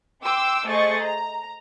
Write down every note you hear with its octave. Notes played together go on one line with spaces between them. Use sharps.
G5 C6 D6 E6
A3 G#4 C5 D#5 C#6 A6
A#5